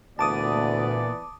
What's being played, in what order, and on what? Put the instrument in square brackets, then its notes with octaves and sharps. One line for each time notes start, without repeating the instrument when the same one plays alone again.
[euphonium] D2 [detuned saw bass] A#2 [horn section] E3 B3 D5 [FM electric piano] A5 D6 D#6